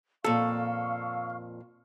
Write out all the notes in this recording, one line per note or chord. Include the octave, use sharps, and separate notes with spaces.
F2 A#2 A4 F5 C#6 F6